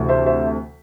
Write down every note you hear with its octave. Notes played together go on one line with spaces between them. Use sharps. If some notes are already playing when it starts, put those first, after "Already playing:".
Already playing: D2 C3 E3 A3
C5 E5
C5 E5